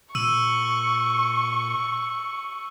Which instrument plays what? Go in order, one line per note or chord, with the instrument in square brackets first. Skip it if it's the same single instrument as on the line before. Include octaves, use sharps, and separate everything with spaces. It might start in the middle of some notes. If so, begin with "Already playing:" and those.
[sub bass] A#2 [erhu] C#6 [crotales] E6 D#7 F#7